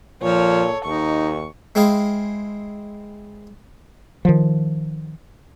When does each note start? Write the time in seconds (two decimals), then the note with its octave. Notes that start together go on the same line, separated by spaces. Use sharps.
0.22 A#2 F3 A4 C#5
0.85 D#2 D#4 C#6
1.75 G#3 C4 E4 G#4 F5
4.25 D#3 F3